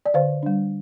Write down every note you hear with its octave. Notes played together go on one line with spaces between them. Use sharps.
D5
D3 C5 F5
G3 D4